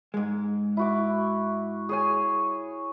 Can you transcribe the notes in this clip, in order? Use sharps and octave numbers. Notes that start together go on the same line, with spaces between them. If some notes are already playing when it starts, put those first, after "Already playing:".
G#2 G#3
E4 F#4 D6
G#4 C#5 G#5